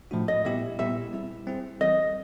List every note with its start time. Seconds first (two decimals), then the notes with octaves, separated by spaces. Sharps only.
0.11 A2 F3 A3 D4 F#4
0.28 D#5
0.45 A#2 G3 B3 E4 G4 E5
0.79 A#2 G3 B3 E4 G4 E5
1.13 G3 C4 E4 G#4
1.47 G3 C4 E4 G#4
1.81 E3 G3 C4 D#5